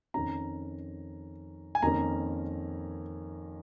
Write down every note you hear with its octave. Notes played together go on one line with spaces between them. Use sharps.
F2 D#3 C#4 A#5
G#5
F2 D#3 A#3 C#4 A#5